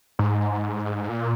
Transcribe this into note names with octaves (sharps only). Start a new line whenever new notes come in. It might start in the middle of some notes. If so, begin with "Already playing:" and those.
G#2
A#2